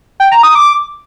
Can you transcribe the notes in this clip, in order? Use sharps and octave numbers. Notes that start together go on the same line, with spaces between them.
G5
A#5
D#6
D6